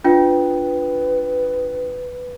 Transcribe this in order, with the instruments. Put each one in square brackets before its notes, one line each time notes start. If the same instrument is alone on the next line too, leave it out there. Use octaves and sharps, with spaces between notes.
[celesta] D4 F4 G5 [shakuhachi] B4